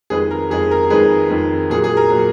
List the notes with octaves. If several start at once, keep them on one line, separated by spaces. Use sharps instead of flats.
F2 D#3 G#3 G#4 B4
A#4
F2 D#3 G#3 G#4
A#4
F2 D#3 G#3 G#4 B4
F2 D#3 G#3
A#2 F#3 G#4
G#4
A#4
A#2 F#3